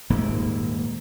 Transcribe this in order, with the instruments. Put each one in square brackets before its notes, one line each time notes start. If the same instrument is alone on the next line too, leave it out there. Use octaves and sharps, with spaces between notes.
[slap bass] D#1 G#2 A#3